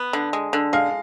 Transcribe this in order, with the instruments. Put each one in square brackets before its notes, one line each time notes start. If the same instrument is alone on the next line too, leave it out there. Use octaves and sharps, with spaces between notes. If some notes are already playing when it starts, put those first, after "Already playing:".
Already playing: [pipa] B3
D3
G#3
D3
[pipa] G#3 [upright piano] F5